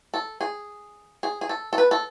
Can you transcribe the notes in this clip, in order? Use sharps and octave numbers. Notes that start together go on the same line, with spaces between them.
A4
G#4
G#4
G#4
A4
A4
B4
A4